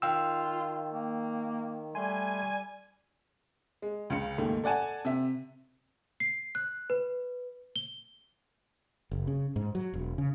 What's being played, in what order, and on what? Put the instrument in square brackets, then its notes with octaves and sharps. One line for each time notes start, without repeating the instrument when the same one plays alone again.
[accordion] D#3 [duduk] F4 [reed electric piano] F5 G5 E6
[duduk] A#3
[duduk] G3 [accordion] A3 C6 [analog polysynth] G#5
[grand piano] G#3
C#2 C#3 C#7
D#2 G#2 A3
A4 D5 F#5 G#5 A5
C3 E5
[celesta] C7
F#6
B4
G7
[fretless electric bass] F#1
C#3
G#2
F#3
E1
C#3